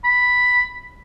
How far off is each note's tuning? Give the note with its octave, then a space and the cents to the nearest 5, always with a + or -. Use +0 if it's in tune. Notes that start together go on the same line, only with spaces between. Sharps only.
B5 +0